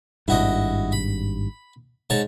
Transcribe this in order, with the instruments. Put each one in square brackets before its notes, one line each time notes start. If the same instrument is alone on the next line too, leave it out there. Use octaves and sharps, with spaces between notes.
[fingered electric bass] G#1 G2 [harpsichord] E4 F#4 D#5
[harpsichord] B5
G#2 C#5 A5